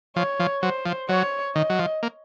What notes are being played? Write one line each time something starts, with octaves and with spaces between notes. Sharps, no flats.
F3 C#5
F3
F#3 C5
F3
F#3 C#5
D#3 D#5
F#3
F3
A#3